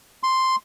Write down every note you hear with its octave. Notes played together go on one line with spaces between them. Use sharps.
C6